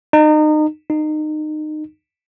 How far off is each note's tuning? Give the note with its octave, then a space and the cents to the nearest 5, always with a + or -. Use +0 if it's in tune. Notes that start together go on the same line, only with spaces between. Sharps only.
D#4 -30
D#4 -25